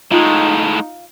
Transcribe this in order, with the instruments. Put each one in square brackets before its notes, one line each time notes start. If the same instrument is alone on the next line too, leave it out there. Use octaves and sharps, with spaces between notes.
[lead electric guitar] A2 G#3 [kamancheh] D#4 [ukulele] F4